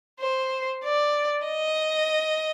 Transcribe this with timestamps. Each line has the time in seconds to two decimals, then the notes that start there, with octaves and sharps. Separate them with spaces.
0.20 C5
0.84 D5
1.47 D#5